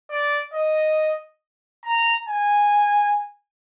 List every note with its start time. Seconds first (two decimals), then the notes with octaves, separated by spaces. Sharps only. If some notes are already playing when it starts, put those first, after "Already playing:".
0.11 D5
0.54 D#5
1.85 A#5
2.29 G#5